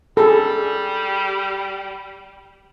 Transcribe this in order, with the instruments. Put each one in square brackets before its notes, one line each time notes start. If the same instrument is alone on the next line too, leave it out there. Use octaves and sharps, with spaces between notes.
[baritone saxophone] G3 [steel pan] G#4 A4